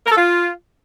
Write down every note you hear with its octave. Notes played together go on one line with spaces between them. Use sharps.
A#4
A4
F4